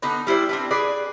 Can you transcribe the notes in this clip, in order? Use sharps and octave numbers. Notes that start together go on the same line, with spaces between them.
D3 B3 D#4 B4
G3 E4 C5 D5
C4 D4 B4
G#4 B4 D5